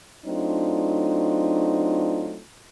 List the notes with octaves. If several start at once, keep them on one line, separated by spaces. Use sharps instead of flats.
F#3 A3 C4 D4 D#4 F4